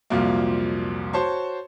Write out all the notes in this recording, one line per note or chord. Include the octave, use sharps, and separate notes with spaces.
C2 F2 A#2 F#3 A#3
F#4 C5 C#5 A5 C6 C#6